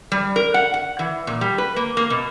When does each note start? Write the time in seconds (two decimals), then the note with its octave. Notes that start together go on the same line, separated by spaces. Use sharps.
0.12 G3
0.36 A#4
0.54 F#5
0.74 F#5
0.99 E3
1.27 A#2
1.41 G3
1.58 B4
1.76 A#3
1.97 A#3
2.10 B2